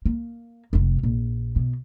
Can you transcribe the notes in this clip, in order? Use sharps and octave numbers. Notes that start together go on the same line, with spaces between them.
A#3
F1 F4
A#1
B2